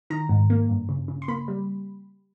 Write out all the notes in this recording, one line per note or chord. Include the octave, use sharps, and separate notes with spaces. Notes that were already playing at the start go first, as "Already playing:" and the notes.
D#3 A#5
G#2
A#3
G2
C#3
C#3
C6
A#3 B5
G3